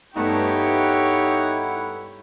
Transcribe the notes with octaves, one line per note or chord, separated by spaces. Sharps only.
G2 A3 B3 D#4 E4 G4 C#5 F#5